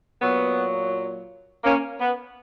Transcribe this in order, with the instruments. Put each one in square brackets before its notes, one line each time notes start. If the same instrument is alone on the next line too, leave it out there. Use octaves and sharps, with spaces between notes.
[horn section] A#2 F#3 B3
A#3 C#4
B3